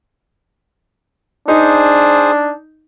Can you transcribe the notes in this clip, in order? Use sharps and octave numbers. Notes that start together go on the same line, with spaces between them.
D4 D#4 G#4 C5